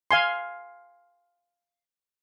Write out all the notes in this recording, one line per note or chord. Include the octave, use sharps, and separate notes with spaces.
F5 G#5 C6